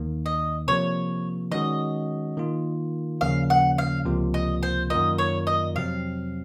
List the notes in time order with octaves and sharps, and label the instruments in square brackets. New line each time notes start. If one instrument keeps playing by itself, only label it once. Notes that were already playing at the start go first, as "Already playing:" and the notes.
Already playing: [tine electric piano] D#2 D#3 A#3
[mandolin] D#5
[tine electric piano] C3 F3 A#3 [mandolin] C#5
[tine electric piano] D#3 G#3 C#4 F#4 [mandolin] D#5
[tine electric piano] D#3 A#3 F4
[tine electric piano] D#2 C#3 F3 A#3 C#4 [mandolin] F5
[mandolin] F#5
F5
[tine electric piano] C#2 C3 F3 A#3 F4
[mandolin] D#5
C5
[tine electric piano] F#2 D#3 A#3 F4 A#4 [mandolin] D#5
[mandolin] C#5
D#5
[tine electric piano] F2 C3 F#3 C4 [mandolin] F5